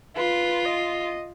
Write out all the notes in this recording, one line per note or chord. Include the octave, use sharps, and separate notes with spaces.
F4 B4
D#5